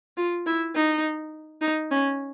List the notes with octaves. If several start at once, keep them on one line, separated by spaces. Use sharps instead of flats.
F4
E4
D#4
D#4
C#4